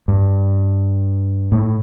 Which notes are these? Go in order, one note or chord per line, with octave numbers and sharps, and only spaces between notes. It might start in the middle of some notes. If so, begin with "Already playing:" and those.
G2
A2